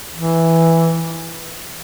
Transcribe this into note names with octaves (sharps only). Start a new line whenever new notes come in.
E3